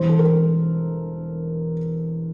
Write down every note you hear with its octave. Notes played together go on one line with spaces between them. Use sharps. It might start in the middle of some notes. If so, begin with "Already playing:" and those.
Already playing: E1 E2 E3 G3 C5
A4
A#4